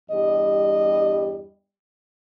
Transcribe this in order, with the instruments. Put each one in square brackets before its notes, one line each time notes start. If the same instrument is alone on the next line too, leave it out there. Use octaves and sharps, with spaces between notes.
[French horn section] E2 G2 G3 D#5